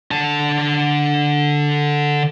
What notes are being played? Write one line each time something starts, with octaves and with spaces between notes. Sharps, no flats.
D3 A5